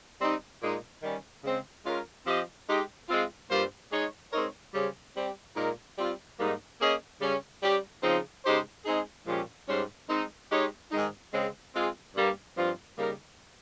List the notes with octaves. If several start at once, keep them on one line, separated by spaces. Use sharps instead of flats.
G3 C4 D#4
A#2 G#3 D#4
D#3 G3 C#4
C#3 G#3 C4
G#3 C#4 F4 A#4
F3 C4 G4 C5 D#5
G#3 D#4 G4
G#3 C4 F4
G2 G3 A#3 F4 C5
G#3 D#4 G#4 C#5
G#3 C4 D#4 A#4 C#5
C#3 G3 C#4 G#4 C5
G3 C4 G4
A#2 G#3 D#4 A#4
G3 C4 F4
G#2 G3 A#3 D#4
A#3 C#4 G#4 D#5
C#3 G3 C#4
G3 C#4 G4
C#3 F3 C4 D#4
C#3 G#3 D#4 G4 C5
G#3 C4 D#4 G#4
A#2 F3 G#3 C#4 G4
G#2 G3 C#4 G4 C5
G#3 C4 D#4
G#3 D#4 G4 C#5
G#2 D#3 G#3 D#4
C#3 G#3 C4
G#3 C4 F4 G#4
G2 G3 A#3
G2 F3 C4 F4
C#3 G3 A#3 D#4 A#4